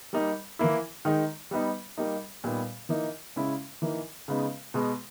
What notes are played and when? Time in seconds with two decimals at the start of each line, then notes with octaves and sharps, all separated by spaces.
0.13 G3 A#3 D#4
0.59 E3 A#3 E4
1.05 D#3 G#3 D#4
1.51 G3 B3 D#4
1.97 G3 A#3 D#4
2.44 A#2 G3 B3 D#4
2.89 E3 A#3 D#4
3.36 C#3 G#3 C#4 E4
3.82 E3 A#3 D#4
4.28 C#3 G#3 B3 D#4
4.74 B2 G#3 B3